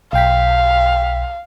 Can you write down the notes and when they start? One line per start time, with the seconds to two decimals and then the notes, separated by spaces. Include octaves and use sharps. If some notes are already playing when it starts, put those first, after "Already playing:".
0.13 B1 F5 G5 B6